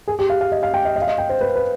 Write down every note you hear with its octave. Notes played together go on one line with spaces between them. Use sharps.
G#4
G4
F5
F5
D#5
F5
G5
D#5
D#5
F5
D#5
G5
C5
B4
B4